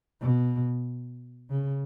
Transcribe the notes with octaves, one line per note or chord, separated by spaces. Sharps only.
B2
C#3